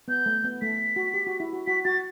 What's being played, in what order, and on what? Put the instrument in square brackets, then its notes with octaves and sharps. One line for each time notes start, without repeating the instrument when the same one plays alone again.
[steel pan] B3 [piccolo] G6
[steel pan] A3
B3
[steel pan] A3 [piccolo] B6
[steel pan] F#4
G4
F#4
E4
F#4
[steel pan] F#4 [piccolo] B6
[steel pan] F#4 [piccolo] A6